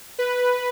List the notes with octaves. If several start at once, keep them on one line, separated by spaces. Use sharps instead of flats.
B4